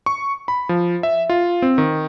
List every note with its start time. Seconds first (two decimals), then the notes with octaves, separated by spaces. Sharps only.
0.06 C#6
0.48 B5
0.69 F3
1.03 E5
1.29 F4
1.62 C4
1.78 D#3